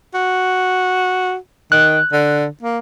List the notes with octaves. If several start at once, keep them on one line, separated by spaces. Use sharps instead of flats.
F#4
D#3 F#6
D3
A#3